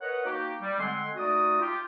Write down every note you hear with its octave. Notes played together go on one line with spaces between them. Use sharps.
A#4 B4 C#5 D#5 F#5
A#3 D#4 F#4 G4
G3
D3 G#3 C4 F#5 G#5 C6
A3 D#4 F#4 D5 D#6
F4 G4